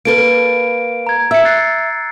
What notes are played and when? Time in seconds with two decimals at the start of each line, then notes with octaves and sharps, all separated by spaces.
0.05 A#3 A4 B4 D7
1.07 A#5 G#6
1.31 E5 E6 C#7
1.45 F#6 A6 C7